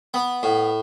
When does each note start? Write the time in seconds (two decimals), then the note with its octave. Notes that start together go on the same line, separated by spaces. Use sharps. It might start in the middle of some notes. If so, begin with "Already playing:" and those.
0.14 B3
0.43 A2